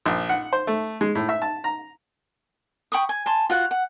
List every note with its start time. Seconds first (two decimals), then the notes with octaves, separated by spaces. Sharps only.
0.06 A#1
0.29 F#5
0.53 C5
0.67 A3
1.01 G#3
1.15 A2
1.29 E5
1.42 A5
1.64 A#5
2.92 G5 B5 C#6 D#6
3.09 G#5
3.26 G#5 A5 C6
3.49 F4 F#4 F#5
3.71 F#5